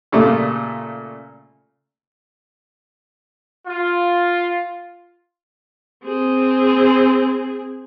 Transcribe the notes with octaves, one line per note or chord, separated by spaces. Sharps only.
A#2 C#3 G3 A3
F4
C4 G#4